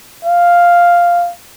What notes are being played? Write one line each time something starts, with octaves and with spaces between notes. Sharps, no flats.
F5